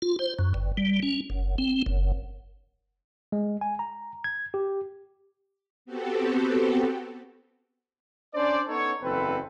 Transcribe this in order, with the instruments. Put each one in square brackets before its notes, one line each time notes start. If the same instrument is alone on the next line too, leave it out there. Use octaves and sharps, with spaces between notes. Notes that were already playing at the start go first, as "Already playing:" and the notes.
[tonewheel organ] F4
C5
F#2
G1
G3
C#4
F#1
C4
F#1
[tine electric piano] G#3
G#5
A#5
G#6
G4
[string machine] B3 C4 F#4 G4 A4
[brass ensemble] C#4 D4 C5 D5
B3 C#4 D#4 A4 C#5
F#1 E2 C4 A4 B4